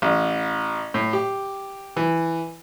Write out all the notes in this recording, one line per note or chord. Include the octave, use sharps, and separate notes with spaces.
A1
A2
G4
E3